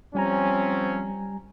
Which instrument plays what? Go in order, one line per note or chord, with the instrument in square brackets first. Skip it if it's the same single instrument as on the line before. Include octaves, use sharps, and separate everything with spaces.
[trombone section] F3 C4 C#4 [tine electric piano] G3 G#5 A#5